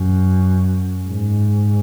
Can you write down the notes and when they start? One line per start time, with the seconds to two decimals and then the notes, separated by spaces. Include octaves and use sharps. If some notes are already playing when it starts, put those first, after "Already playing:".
Already playing: F#2
1.09 G#2